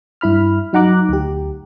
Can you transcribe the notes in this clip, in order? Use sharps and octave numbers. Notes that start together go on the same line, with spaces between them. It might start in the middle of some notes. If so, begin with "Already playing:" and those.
G2 E4 B5 F6
F#3 D#4 F#5 A#5 D6 F#6
D2 G4